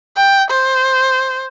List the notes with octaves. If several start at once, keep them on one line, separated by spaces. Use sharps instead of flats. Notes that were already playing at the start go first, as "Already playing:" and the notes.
G5
C5